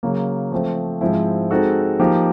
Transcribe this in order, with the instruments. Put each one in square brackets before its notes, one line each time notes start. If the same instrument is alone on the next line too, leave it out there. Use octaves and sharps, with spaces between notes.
[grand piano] C#3 F#3 A#3
F3 A3 C4
G#2 F3 G#3 C4 E4
G#3 C4 D#4 F#4 A4
F3 A#3 D#4 G4